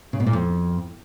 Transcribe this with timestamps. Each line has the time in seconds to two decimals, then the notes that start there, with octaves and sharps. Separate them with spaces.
0.13 C#3
0.20 B2
0.26 A#2
0.33 F2